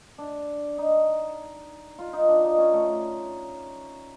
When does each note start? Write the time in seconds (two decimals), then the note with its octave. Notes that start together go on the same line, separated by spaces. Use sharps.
0.18 D4
0.78 D#4
1.99 F4
2.13 D#4
2.28 D4
2.44 D#4
2.58 C#4
2.73 A3